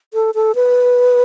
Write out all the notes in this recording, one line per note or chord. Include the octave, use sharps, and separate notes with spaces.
A4
A4
B4